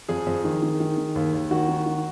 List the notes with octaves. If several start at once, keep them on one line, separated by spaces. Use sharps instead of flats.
F2 G#4
F2
D#3
D#3
D#3
D#3
D#2
D#2
D#3 F#4
D#3
D#3